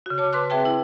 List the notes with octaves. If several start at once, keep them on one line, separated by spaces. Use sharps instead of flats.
C#3 F#4
C#5 A5 D6
B4 A5 C6 D6 F#6
C4 G#4 B4 E5 G5 A5
E4